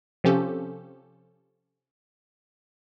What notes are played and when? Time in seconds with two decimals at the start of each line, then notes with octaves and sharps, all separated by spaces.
0.24 C3 F3 C4 C#4 G4 A4